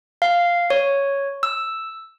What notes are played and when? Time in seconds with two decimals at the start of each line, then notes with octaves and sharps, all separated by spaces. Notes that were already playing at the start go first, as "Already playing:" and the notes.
0.22 F5
0.70 C#5
1.43 E6